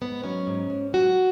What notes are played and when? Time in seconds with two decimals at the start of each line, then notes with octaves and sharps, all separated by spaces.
0.01 G#2 B3
0.23 F#3 C#4
0.47 G#2
0.70 G#2
0.93 F#3 F#4